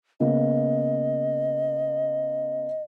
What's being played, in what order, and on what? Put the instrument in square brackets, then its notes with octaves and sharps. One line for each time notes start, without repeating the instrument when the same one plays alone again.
[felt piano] C#3 A#3 B3 [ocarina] D#5